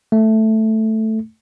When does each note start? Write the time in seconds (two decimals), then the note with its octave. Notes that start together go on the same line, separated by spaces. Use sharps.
0.12 A3